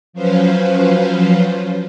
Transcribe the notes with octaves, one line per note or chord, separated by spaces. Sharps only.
F3 F#3 C#4 F4 B4 C5